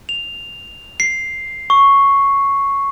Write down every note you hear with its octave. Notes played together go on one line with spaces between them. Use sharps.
F7
C7
C#6